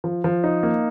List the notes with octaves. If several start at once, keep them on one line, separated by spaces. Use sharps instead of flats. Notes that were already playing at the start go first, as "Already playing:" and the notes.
F3
F3
D#4
A#3